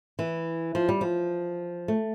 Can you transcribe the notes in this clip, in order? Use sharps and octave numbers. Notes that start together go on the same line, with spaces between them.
E3
F3
G3
F3
A3